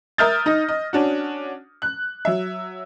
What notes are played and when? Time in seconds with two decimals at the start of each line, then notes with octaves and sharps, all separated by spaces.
0.18 A#4 E5 D#6 F6 G6 A6
0.46 D#4 D#5 A#6
0.69 D#5
0.93 C#4 D4 F#4
1.82 F#6
2.25 F#3 E5